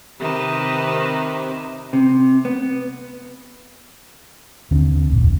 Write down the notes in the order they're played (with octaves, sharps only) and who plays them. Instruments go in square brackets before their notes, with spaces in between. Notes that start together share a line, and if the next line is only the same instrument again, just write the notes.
[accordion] C3 [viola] D#3 B4
[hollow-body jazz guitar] C3
B3
[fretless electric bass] D#2 D3 C4 D4
D1 G#1 F2 A#2